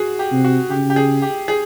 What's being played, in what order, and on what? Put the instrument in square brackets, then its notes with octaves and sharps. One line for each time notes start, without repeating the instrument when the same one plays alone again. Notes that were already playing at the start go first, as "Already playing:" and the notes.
Already playing: [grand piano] F#4 G#4
G4
[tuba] C3
[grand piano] F#4
[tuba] C#3 [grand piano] G4
[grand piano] G4
G#4
G4
G#4